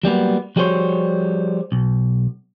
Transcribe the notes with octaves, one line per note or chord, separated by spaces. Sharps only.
F#3 G3 A#3 B3
F3 G3 F#4 G#4 C5 C#5
B1